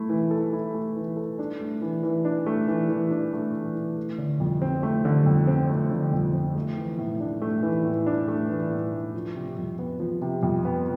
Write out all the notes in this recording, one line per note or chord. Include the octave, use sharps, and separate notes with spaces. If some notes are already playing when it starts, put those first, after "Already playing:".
Already playing: A3 E4
E3
A4
E4
A3
E3
A4
D4
A3
E3
E3
D4
A3
E3
E3
D4
A3
E3
E3
A3
D3
F2
C4
A3
D3
F2
C4
A3
D3
F2
C4
A3
E3
A2
D4
A3
E3
A2
D4
A3
E3
A2
D4
F3
C3
F2
B3
F3
C3
F2
B3